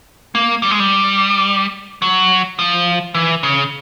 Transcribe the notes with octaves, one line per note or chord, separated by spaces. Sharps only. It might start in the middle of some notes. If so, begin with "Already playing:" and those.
A#3
G3
G#3
G3
F#3
F3
E3
C#3